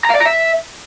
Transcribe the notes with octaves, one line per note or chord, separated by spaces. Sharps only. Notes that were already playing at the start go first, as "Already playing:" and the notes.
A#5
F5
D5
A#5
E5